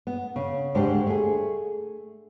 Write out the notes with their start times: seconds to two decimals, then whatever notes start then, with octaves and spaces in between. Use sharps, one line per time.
0.07 B3
0.36 C#3
0.75 D2 G#2 G#3 D4 G4 C5
1.07 A3 G#4